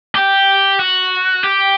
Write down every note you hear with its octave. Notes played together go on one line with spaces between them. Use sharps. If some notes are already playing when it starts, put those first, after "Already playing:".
G4
F#4
G4